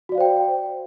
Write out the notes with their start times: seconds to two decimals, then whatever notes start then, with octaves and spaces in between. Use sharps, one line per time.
0.09 F#4
0.12 D5
0.15 F5
0.18 C5
0.20 G5